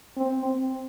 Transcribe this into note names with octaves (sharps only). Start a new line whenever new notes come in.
C4
C4